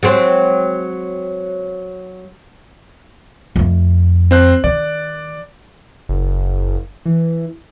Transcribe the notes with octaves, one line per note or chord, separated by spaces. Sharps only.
F#3 G#3 C4
F2 A3
C4 C5 F#6
D#3 D5
F#1
E3